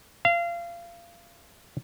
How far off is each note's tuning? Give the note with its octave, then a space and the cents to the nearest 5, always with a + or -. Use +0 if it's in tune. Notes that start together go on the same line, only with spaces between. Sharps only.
F5 -30